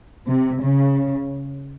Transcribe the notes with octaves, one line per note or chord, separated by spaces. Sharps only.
C3
C#3